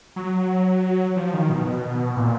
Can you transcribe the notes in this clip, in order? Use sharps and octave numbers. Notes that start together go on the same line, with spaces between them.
F#3
F3
D#3
B2
B2
A#2